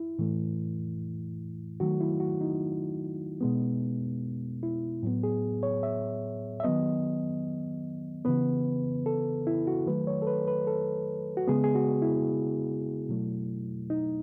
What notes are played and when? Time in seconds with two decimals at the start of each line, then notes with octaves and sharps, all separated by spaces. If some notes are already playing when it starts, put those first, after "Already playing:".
Already playing: E4
0.19 A2 E3 A3
1.80 D#3 F#3 A3 F#4
2.00 E4
2.20 F#4
2.41 D#4
3.41 B2 G#3 B3
4.63 E4
5.03 A2 F#3 B3
5.23 G#4
5.63 C#5
5.83 E5
6.60 E5
6.63 D#3 F#3 B3 D#5
8.25 C#3 E3 B3 B4
9.06 A4
9.47 E4
9.67 F#4
9.87 D#3 F#3 A3 B4
10.07 C#5
10.22 A4
10.27 B4
10.48 B4
10.67 A4
11.37 F#4
11.48 C#3 G#3 B3 G#4
11.64 G#4
11.75 F#4
12.02 E4
13.09 B2 F#3 A3
13.90 D#4